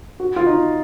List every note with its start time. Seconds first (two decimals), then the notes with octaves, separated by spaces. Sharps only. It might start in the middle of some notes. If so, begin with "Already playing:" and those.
0.20 F#4
0.36 F4
0.46 D#4